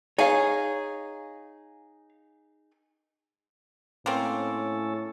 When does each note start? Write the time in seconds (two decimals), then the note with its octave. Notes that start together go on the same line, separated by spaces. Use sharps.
0.18 D#4 G#4 C#5 F5 G#5
4.06 A2 A#3 C4 C#4 A4